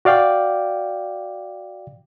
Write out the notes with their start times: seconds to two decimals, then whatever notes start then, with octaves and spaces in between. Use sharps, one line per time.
0.05 F#4 D5 F5 G5 D6